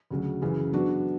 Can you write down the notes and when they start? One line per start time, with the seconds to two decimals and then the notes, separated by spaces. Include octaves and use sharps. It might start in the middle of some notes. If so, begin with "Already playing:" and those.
0.11 D2 C#3 F#3
0.42 F#2 C#3 E3
0.73 F#3 B3 D4 F#4